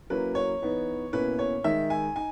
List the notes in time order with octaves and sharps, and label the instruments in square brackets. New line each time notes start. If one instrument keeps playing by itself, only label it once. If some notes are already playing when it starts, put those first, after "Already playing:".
[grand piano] F#3 A#3 C#4 E4 B4
C#5
E3 B3 D#4
B2 A#3 C#4 E4 B4
C#5
D#3 G#3 D#4 E5
G#5
D#4 G#5